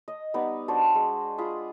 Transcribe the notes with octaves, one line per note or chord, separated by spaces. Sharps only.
D#5
G3 B3 D#4 B4
D4 F#4 C5 A5
G#3
F4 G#4 B5